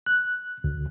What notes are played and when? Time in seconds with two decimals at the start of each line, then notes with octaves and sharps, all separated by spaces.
0.06 F#6
0.64 D2